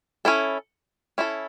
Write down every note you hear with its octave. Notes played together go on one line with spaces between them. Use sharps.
C#4 E4 A4
C#4 E4 A4